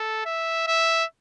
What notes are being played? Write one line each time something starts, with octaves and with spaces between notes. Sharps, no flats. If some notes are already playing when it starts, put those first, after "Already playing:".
Already playing: A4
E5
E5